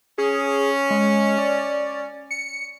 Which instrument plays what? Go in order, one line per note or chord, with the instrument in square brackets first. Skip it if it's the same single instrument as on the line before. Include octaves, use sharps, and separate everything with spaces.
[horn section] C#4 [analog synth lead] G#4
[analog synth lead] G#3
D5
C#7